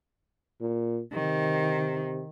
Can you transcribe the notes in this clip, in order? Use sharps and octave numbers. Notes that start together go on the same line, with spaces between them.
A#2
C3 D#3